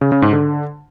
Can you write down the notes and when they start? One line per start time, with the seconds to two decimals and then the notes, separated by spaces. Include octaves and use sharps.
0.01 C#3
0.12 C#3
0.22 G#2
0.33 D3